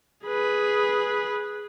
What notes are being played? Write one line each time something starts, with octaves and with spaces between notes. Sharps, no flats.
G#4 B4